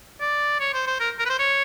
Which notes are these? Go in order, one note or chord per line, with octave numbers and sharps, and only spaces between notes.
D5
C#5
C5
C5
A#4
A#4
B4
C5
C#5